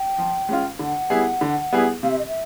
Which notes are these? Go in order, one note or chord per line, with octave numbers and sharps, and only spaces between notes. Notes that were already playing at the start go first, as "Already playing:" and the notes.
Already playing: G5
F3
G#3 C#4 F4
D3 F#5
G3 B3 E4 G#4
D3
G3 B3 E4 G#4
C3 F5
E5
D#5
E5